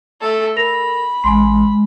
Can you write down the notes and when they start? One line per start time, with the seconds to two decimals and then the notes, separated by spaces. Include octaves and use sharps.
0.21 A3 A4
0.56 A#4 B5 A#6 F7
1.24 A1 G#3 G#5 C6